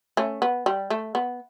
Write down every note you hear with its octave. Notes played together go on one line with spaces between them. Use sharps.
A3 C#4
B3
G3
A3
B3